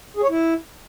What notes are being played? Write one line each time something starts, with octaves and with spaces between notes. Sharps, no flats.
G#4
C#5
E4